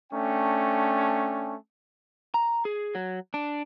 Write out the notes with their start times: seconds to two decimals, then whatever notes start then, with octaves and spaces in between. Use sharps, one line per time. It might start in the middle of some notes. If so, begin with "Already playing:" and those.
0.13 A3 C#4 D4 G5
2.34 A#5
2.65 G#4
2.95 F#3
3.34 D4